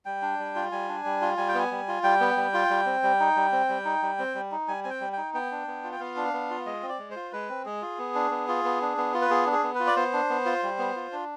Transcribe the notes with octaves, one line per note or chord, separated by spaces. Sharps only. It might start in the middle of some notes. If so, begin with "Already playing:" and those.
G3 G5
D4
G3
F4
G3 G#5
D4
G3
F4
G3 G#5
G5
B3 G#5
G3
F4
G3 G5
B3
G3
F4
G3
C4
G3
D#4
G3
C4
G3
D#4
G3
C4
G3
D#4
G3 G#5
C4 G#5
G5
G3
D#4 G5
B3 G5
D4
B3
F4
G5
B3 F5
D4
B3
F4
G#3 D#5
C4
D5
G#3
C5
F4
G#3 B4
C4
G#3 G#4
F4
B3
D4
B3
F4
B3
D4
B3
F4
B4
B3 G#4
D4
G#4
B3
F4 B4
D5
B3 C5
D4
B3
F4
G3
B3
F4
D4